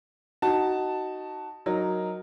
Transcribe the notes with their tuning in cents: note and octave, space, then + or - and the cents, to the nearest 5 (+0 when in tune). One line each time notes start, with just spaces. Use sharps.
D#4 +0 F#4 +15 A5 +0
F#3 +0 D#4 +0 A#4 +0